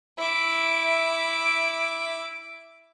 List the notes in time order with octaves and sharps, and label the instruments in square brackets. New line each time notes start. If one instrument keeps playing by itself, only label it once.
[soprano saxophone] E4 [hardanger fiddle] E5 D6